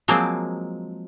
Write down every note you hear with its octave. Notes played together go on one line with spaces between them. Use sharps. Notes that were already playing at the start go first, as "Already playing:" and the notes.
F3 F#3 G#3 A#3 C4